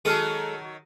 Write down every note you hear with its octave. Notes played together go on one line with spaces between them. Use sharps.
D#3 F#3 G#3 A4 A5 D#6 F6 D#7